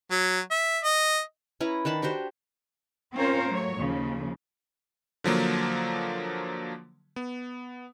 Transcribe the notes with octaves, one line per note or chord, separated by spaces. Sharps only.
F#3
E5
D#5
C#4 E4 B4 A#5
D#3 D4 A5 B5
D4 F#4 G4 C5
C4 C#4 F4 A#4 C5 C#5
F#3 A3 C#5
D#2 C#3 F3
D3 F3 F#3 A#3
B3